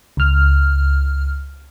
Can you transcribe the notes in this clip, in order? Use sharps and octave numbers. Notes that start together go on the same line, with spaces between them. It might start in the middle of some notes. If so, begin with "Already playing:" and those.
C#2 F6